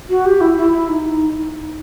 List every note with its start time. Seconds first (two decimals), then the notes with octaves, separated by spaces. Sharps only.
0.09 F#4
0.25 G4
0.40 E4
0.56 E4
0.72 E4
0.88 D#4